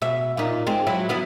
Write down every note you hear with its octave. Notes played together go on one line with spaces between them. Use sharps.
B2 E5
A#2 D#4
G#3 C4
F#3 E4
F#3 B3 E4